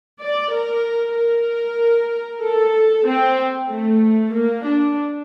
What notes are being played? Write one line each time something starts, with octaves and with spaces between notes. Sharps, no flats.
D5
A#4
A#4
A4
C4
A3
A#3
D4